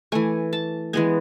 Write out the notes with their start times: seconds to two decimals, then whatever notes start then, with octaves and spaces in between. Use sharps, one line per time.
0.12 E3 A3 G#5
0.53 A5
0.93 E3 G#3 B3 G#5